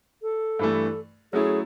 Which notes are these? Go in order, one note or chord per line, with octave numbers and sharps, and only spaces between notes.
A4
G2 E3 A3
F#3 A3 C#4 E4 G#4